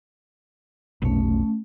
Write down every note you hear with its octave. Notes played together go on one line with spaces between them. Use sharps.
F1 B1 A3 C#4